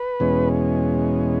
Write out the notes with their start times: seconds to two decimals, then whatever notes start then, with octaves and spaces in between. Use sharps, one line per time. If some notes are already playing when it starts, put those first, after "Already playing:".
Already playing: B4
0.20 E2 B2 G#3 C#4